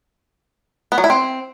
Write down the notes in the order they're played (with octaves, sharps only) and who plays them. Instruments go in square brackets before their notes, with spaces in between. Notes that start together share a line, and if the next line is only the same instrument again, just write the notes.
[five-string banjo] B3
F#3
E4
C4